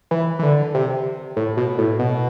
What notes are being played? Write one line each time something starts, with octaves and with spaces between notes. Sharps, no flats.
E3
E3
D3
C3
A2
B2
A2
B2